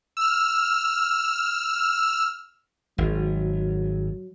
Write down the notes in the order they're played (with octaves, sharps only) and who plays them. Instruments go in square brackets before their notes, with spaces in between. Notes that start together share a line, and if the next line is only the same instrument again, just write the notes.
[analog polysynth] E6 F6
[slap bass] G#1 [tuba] F#3